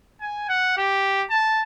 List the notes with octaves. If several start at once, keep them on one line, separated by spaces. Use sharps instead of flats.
G#5
F#5
G4
A5